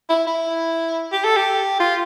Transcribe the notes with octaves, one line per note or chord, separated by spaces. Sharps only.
E4
E4
G4
A4
G4
F4